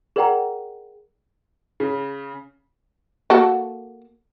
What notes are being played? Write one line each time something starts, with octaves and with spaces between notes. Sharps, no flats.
G#4 A#4 D5 F#5 G5 A#5
C#3
A#3 F#4 A4